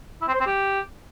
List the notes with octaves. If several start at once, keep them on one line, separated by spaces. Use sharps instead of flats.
E4
C4
C5
C4
G4